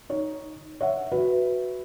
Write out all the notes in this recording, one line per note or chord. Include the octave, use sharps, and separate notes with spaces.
D#4 C#5
C#5 E5 F#5
F#4 B4 E5